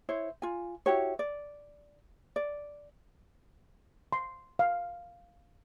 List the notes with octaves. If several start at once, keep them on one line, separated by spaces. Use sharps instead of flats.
E4 C5 C#5
F4 G#5
E4 F#4 G4 C#5
D5
D5
C6
F5